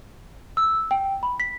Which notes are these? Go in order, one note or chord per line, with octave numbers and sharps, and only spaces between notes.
E6
G5
B5
B6